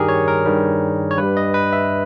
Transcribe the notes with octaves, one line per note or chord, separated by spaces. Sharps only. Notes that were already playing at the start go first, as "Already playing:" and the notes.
Already playing: G2 D#3 G3 G4 G#4 A#4
C#5
A#4
G2 D#3 G3
C#5
G2 G3 B4
D#5
B4
E5